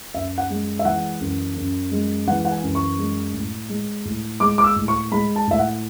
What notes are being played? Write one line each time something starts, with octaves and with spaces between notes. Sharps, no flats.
F#2 E5
F#5
G#3
E5
E3 F#5
F#2
F#2
G#3
E3 F#5
F#5
G#5
F#2
C#6
G#3
A2
G#3
A2
G#3 D6
D6
E6
A2
C#6
G#3 B5
A5
A2 E5
F#5